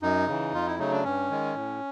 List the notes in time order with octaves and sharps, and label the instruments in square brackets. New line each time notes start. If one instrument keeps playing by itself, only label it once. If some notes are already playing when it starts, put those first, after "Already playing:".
[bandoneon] F#2 D#4
C#3 E3
F2 F4
E4
C#3 F#3 A3 D#4
D4
G2 C#4
D#3 G#3
A2